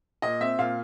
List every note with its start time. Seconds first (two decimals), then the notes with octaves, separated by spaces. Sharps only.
0.22 A#2 D#5
0.41 C4 E5
0.59 A#2 F5